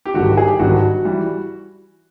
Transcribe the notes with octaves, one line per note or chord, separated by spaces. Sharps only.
G4
G#1 G2 D3 F#4
G4
G#4
G4
G#1 G2 D3 F#4
E3 G3